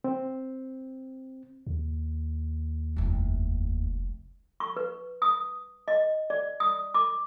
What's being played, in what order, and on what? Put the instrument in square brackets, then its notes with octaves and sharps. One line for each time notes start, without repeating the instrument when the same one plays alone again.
[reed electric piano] C4
[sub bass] D#2
[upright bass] F1 C2
[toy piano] C#6
B4
D#6
D#5
D5
D#6
D6